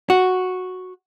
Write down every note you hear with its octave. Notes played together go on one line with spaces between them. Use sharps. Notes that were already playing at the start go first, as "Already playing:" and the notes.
F#4